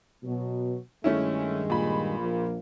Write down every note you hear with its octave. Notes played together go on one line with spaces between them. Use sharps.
B2 F#3
G2 D#3 G#3 A3 C#4 E4
A#2 B5
A#1 A#3